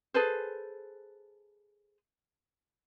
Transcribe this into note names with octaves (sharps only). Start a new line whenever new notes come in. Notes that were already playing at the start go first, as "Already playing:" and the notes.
G#4 A4 B4 C5